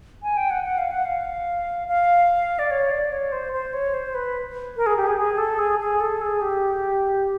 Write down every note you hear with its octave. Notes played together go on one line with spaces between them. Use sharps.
G#5
G5
F#5
F#5
F5
F#5
F5
F5
D5
C#5
D5
C#5
C5
C5
C#5
C5
B4
A#4
G#4
G4
G#4
G#4
A4
G#4
G#4
A4
G#4
G4